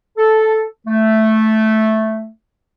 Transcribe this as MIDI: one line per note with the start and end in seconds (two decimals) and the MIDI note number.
0.18 0.64 69
0.87 2.29 57